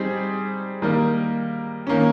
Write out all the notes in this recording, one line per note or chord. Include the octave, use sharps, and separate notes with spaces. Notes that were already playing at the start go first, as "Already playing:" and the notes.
Already playing: G3 C4 D#4 G#4
D#3 G3 A#3
D#3 A#3 C#4